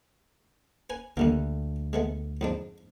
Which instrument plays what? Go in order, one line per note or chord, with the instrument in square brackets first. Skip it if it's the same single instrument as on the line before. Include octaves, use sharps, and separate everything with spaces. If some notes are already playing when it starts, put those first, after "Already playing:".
[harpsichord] B4 G#5
[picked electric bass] D2 [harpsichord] D3 G3 A#3
[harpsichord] G#3 A3 B3
F2 G#2 D4